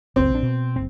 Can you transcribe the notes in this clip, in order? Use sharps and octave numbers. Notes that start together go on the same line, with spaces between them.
F#1 C#2 C4
A#1 D4
B2
F#1 C2 C4